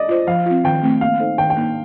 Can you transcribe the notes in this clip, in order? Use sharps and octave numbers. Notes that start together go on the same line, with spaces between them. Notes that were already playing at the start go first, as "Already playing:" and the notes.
Already playing: D5 D#5
F4 C5
F3 F5
C4 F4
D#3 G5
A3 C4
A#3 F5
D#4 A4 C5
D#3 G5
G5
A#3 D#4